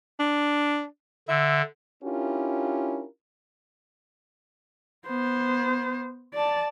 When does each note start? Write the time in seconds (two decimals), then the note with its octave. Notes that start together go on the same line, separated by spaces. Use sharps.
0.19 D4
1.28 D3 E5
2.03 C#4 D4 E4 F4 G4 A#4
5.06 B3 C5
6.34 D5 A5